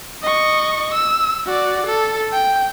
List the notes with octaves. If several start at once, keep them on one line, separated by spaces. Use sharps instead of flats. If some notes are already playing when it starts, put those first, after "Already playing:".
D#5 C#6
E6
F#4 D5
A4
G5